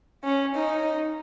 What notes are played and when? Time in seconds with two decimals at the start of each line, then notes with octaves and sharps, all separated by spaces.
0.24 C#4
0.55 D#4